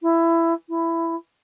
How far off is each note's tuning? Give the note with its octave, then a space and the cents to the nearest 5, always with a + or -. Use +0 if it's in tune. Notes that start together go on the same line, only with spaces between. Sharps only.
E4 +15
E4 +10